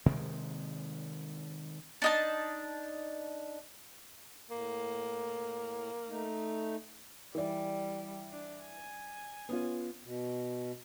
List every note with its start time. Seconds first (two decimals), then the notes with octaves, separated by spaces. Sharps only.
0.06 C3 D#3 G#3 C4
2.02 D4 D#4 A5
4.50 A2 A#3
6.08 A3 D#4
7.35 E3 G3 D5
8.32 D4
8.65 G#5
9.49 B3 C#4 F4
10.04 B2